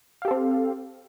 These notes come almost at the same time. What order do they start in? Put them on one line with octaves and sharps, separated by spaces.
F5 G4 A4 C4